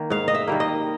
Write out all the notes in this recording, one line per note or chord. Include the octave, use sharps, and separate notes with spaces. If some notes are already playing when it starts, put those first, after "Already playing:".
Already playing: D#3 A#3
G#2 F5
D#5
E5
D#3 G3 A#3
D#5